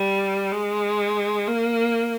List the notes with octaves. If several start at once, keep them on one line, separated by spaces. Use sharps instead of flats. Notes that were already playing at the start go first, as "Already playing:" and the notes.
Already playing: G3
G#3
A#3